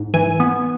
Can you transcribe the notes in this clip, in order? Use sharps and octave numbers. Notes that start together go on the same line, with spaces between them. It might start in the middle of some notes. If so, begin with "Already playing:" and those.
Already playing: G#2
E3 G#5
B3